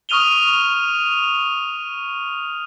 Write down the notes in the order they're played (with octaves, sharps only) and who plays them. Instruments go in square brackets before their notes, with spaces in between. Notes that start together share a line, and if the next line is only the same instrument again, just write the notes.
[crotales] C#6 D#6 F6 D#7 F7 G7